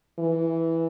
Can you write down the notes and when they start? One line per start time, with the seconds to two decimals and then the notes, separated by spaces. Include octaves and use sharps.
0.19 E3